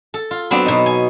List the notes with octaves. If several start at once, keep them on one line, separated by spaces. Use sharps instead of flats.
A4
F4
F#3 B3 C4 D4
B2 D#4
G#5